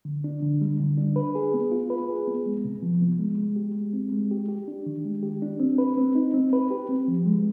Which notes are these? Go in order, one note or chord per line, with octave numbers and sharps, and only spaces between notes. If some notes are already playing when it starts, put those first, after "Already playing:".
D3
D4
D3
G3
D3
D4
B4
G#4
B3
F4
B4
G#4
B3
G#3
C3
F3
B3
G#3
G#3
G4
G#3
C4
G#3
G4
G4
D4
D#3
G#3
G4
D4
C4
B4
C4
D#4
C4
B4
G4
C4
F3
G#3